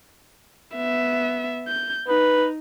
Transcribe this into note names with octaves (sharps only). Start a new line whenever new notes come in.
B3 E5
G6
D#4 B4